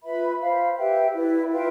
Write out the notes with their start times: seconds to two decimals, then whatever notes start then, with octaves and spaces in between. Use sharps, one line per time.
0.03 F4 B4 E5 B5
0.40 C5 F5 B5
0.77 G4 B4 E5 G5
1.13 E4 B4 D5
1.51 F4 B4 E5 G5